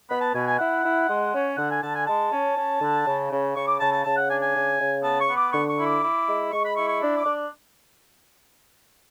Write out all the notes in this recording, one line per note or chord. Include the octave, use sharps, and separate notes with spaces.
B3 B5
A5
B2 G#5
G#5
E4 F#5
E4
G#3
C#4
D3 F#5
G#5
D3 A5
G#5
G#3 A5
C#4
C#4
D3
C#3
C#3
C#3 C#6
D6
C#3 A5
A5
C#3 A5
F#5
D4 G#5
G#5
C#3
C#3
B3 A5
C#6
B3
D6
D3 C#6
C#6
E4
D6
E4
G#3
G#3 C#6
B5
E4 C#6
C#6
D4
D6
D4